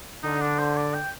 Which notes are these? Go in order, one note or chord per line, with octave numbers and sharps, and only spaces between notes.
D3 D#4
D4
C5
D5
G5